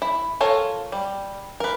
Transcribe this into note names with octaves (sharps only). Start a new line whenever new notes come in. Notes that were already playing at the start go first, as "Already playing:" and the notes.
E4
F4 A4 A#4 C#5
G3
A#4 B4